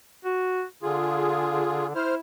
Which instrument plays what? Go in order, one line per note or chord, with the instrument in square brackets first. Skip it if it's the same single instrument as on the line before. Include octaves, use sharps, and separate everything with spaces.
[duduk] F#4
[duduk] D3 [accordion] F4 G#4
[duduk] E4 [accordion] C5 F6